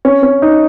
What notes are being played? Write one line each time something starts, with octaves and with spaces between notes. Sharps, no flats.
C#4
C#4
D#4